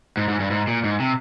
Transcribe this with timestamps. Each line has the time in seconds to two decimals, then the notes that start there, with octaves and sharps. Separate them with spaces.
0.17 G#2
0.28 G#2
0.40 G2
0.50 G#2
0.67 A#2
0.84 G#2
1.00 C3